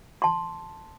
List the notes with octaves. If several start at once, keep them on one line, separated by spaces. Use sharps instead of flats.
A5 C6